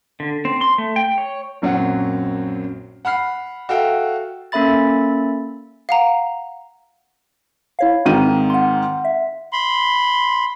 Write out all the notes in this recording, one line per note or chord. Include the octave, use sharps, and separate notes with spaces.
D3
C4
C6
A3
G5
C#5
A#1 F#2 F#3 C4 F#5
F#5 B5 F6 C7
F#4 A4 E5 F5 G5
A#3 C#4 A4 E5 B5 A6
F5 F#5 A#5
E4 C#5 F5
G#2 D#3 C4 D#7
F#5 C6
E5
B5 C6